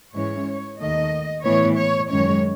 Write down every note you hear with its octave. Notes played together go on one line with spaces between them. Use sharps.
G#2 E3 G#3 C#4 C#5
D#2 D#3 A3 D#5
A2 E3 B3 C#5
C#5
F#2 D#3 G#3 C#4 C#5